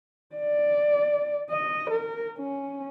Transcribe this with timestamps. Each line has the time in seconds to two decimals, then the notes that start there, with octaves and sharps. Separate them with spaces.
0.36 D5
1.50 D#5
1.90 A#4
2.39 C#4